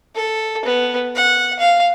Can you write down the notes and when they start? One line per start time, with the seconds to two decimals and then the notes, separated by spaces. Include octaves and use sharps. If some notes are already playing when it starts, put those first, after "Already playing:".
0.15 A4
0.65 B3
1.16 F#5
1.59 F5